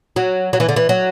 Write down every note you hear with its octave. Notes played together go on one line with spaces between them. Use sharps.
F#3
F#3
E3
D3
E3
F#3